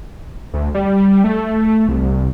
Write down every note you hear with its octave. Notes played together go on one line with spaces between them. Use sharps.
D2
G3
A3
C2
C2